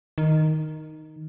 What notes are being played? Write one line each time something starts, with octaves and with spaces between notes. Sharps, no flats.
D#3